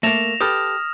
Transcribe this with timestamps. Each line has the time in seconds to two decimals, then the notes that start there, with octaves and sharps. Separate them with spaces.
0.03 A3 A#3 A#6 E7 F7
0.41 G4 A4 B4 D#6 F6